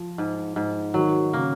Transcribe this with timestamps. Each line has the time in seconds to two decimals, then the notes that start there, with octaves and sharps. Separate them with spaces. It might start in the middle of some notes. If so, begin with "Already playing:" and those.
Already playing: F3
0.18 G#2
0.56 G#2
0.94 D#3 F#3
1.33 C#3 A#3